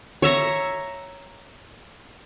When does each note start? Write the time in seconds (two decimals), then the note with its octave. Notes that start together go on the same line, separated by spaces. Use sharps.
0.22 C#5 E5 A#5 C#6